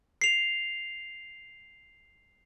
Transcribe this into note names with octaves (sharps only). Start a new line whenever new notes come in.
C7 F7